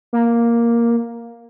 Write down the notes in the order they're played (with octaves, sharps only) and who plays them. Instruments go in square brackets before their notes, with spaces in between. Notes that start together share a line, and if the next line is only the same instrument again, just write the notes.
[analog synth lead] A#3